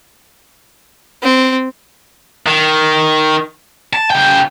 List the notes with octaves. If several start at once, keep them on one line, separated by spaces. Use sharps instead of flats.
C4
D#3
A5
C#3 G5